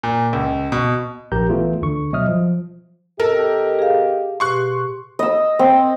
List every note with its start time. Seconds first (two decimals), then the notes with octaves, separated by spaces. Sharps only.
0.03 A#2
0.33 C#2
0.72 B2
1.32 A#1 G4 A#4 A#5 G6
1.49 E3 A3 B3 F4 G#4
1.82 D2 D3 C#6
2.13 B2 F#3 D#5 E5 D#6 F6
2.28 F3
3.20 C3 G4 A4 A#4 D#5
3.79 G#4 F5
4.40 B2 G4 C6 C#6 F#6
5.19 D#5 E6
5.59 C4